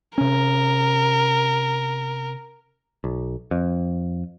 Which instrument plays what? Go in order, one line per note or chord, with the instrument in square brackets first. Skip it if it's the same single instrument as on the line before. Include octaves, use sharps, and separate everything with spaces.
[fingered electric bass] C3 C#4 [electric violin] A#4
[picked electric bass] B1
F2